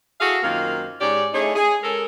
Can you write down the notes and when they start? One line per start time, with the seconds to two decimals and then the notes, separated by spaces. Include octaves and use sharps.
0.20 E4 F#4 G#4 A4 F5
0.43 F#2 D#3 A#3 C4 F4 F5
1.00 G#2 C#4 G4 D5
1.33 A3 C#4 D#4 E4 G#4 C#5
1.56 G#4
1.83 G#3 C#4 A4 A#4